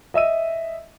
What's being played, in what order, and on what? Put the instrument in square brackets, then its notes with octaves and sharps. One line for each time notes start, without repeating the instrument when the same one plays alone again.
[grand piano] D#5 E5 E6 D#7